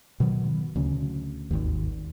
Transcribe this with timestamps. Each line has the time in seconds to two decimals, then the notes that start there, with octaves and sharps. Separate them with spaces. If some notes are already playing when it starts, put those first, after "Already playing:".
0.20 B2 D#3 F#3
0.76 D2 C#3
1.51 G#1 D#2